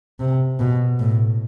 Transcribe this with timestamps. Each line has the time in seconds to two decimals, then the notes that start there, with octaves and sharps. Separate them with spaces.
0.20 C3
0.60 B2
1.00 A2